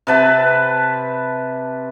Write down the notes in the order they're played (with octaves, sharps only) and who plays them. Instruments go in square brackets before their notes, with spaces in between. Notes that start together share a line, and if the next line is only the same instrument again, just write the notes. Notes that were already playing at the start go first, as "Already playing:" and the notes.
[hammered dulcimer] C3 B4 A5